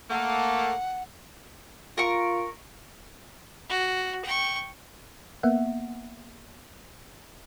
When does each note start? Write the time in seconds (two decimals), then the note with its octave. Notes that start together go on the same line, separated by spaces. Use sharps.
0.11 A3 A#3 A4 F#5
1.98 F4 A#4 C#6
3.70 F#4
4.25 G5 C#6
5.43 A#3 B3 E5 F#5